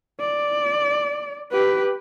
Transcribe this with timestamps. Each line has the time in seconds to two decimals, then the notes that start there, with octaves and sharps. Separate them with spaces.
0.20 D5
1.52 G4 B4